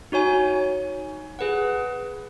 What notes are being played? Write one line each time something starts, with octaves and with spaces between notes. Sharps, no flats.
D#4 F#4 C#5 G#5
G#4 B4 F#5